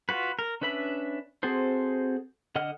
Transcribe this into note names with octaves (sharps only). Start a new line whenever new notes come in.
F4 F#4 B4
A#4
C#4 D4 B4 E5 B5
C4 F#4 G#4 A4 C5
D3 D#5 F#5 F6